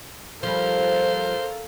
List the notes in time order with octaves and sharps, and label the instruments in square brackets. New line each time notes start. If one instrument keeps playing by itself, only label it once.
[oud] F3 G3 [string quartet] A4 A#4 F5 [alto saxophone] C5